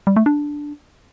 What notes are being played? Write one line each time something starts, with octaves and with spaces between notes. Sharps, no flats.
G3
A3
D4